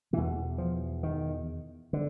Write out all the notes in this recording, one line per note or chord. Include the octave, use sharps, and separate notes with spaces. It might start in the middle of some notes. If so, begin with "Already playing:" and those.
E2 B2 E3
F3
D#3
D3